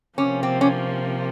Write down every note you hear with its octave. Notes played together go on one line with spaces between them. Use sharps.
C3 F3 A#3 C#4
C4
C#4